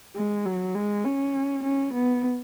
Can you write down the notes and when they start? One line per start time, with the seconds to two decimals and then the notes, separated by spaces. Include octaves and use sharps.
0.16 G#3
0.45 F#3
0.75 G#3
1.04 C#4
1.64 C#4
1.94 B3